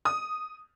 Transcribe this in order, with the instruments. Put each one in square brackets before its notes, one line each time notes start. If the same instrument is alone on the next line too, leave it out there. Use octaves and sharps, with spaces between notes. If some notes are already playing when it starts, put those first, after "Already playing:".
[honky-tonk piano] D#6